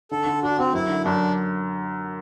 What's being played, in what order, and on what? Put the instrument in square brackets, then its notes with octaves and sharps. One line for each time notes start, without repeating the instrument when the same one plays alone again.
[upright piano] D3 [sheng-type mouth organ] A4
[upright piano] D3
[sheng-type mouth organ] D4 [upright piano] F#4
[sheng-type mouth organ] C4 [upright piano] F#4
[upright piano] F#2 [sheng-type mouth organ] E4
[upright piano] D3
[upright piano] F#2 [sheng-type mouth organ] D4